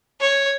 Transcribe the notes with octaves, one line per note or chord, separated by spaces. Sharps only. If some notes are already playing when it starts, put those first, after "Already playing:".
C#5